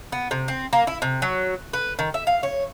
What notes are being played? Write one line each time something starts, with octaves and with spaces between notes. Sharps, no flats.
B3
C3
C4
A#3
E4
C3
F#3
B4
D#3
E5
F5
C#5